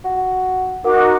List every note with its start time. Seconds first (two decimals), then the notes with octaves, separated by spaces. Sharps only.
0.04 F#4
0.84 D#4 F#4 A#4 F#5 D6